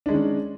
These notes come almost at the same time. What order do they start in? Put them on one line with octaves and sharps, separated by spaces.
D4 G#3 D#3 C#4